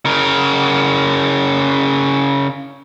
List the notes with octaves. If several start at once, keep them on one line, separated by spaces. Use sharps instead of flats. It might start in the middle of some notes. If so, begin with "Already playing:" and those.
C#3 A#4